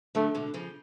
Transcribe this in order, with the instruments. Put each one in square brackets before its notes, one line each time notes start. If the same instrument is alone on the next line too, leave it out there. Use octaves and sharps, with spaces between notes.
[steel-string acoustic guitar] D3 F#3 [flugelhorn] A3
[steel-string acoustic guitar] B2 D3
C#3 F3